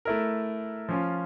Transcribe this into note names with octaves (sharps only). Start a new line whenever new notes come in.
A3 E4 A#4
F3 C#4 F4